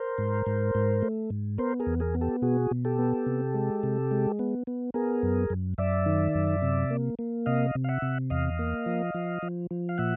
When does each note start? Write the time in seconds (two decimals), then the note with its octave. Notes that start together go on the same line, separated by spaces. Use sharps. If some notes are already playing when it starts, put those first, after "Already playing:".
Already playing: A#4 C5
0.18 G#2
0.46 G#2
0.75 G#2
1.02 A3
1.30 G#2
1.58 B3 A#4 C5
1.80 G#4 A#4
1.86 E2
2.00 G#4 A#4
2.15 B3
2.21 G4 A4
2.42 B2 F#4 G#4
2.71 B2
2.85 G4 A4
2.99 B3
3.26 C3
3.54 G#3
3.83 C3
4.11 G#3
4.39 B3
4.67 B3
4.94 B3 G#4 A#4
5.23 F#2
5.50 F#2
5.78 F#2 D5 E5
6.06 D#3
6.35 F#2
6.62 C3
6.91 A#3
7.19 A#3
7.46 C3 D#5 F5
7.75 C3
7.84 F5
7.89 E5 F#5
8.02 C3
8.30 E2 D#5 F5
8.59 A#3
8.86 F3
9.14 F3
9.42 F3
9.71 F3
9.89 F5
9.98 A#2 E5 F#5